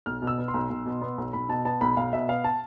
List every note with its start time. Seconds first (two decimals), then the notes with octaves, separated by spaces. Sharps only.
0.06 B1 F6
0.22 B2
0.27 E6
0.38 B3
0.48 C6
0.54 B1
0.70 B1
0.86 B2
1.01 B3
1.18 B1
1.33 B1 B5
1.49 B2 A5
1.65 B3 A5
1.81 B1 B5
1.97 B1 F5
2.13 B2 E5
2.29 B3 F5
2.44 A5